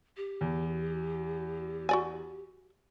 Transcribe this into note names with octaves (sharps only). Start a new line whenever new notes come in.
G4
E2
F#4 D5 G#5